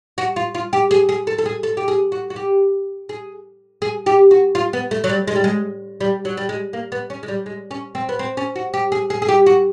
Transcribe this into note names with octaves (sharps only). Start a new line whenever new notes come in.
F#4
F4
F4
G4
G#4
G#4
A4
A4
G#4
A4
G4
G#4
F#4
F#4
G4
G#4
G#4
G4
F#4
F4
B3
A3
F#3
G3
G#3
G3
G#3
G3
F#3
G3
G#3
A#3
B3
C#4
G#3
G3
G#3
C#4
C4
B3
C4
C#4
F#4
G4
G#4
G#4
G#4
G4
F#4